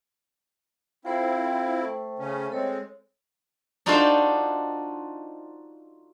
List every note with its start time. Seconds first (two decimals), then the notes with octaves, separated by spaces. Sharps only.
1.05 C4 E4 F4 A4 C5 G5
1.82 A3
2.19 C#3 C#4
2.52 G#3 C4 A4 C#5
3.86 D4 D#4 F4 F#4 A4 C5